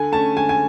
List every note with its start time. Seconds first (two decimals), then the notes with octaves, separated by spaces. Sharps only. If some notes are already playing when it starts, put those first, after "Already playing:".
Already playing: D3 G#5
0.12 A3 C#4 A5
0.36 D3 G#5
0.49 G#5